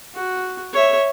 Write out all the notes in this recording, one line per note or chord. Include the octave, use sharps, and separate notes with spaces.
F#4
C#5 E5